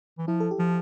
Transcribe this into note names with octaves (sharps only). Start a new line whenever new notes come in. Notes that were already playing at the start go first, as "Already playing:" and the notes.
E3
F3 E4
A4
G4
F3